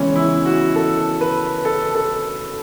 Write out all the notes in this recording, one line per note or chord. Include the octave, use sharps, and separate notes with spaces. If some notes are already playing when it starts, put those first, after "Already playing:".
Already playing: C#3 E3 G#3 B3 C#4
E4
F#4
A4
B4
A4
A4